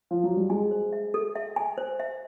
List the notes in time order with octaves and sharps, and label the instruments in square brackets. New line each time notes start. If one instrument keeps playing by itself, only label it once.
[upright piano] F3
F#3
G3
[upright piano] G#3 [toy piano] G#5
[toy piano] C5
E5
A4
E5
G#5
C5
E5